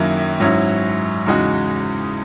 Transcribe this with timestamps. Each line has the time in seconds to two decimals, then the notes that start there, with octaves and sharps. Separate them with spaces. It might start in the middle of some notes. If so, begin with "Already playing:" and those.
Already playing: F#2 D#3 F#3 A#3 E4
0.40 G#2 F#3 C#4 E4
1.27 E2 C#3 G#3 D#4 F#4